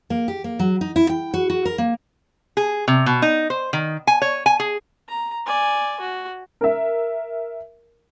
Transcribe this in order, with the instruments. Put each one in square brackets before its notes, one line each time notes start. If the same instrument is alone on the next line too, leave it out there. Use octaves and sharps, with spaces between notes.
[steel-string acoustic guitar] A#3
G4
A#3
F#3
D#4
E4
G5
F#4
F#4
A#4
A#3
[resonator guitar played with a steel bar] G#4
C3
B2
D#4
C5
D#3
G#5
C#5
G#5
G#4
[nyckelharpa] A#5
D5 G#5
F#4
[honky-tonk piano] A#4 E5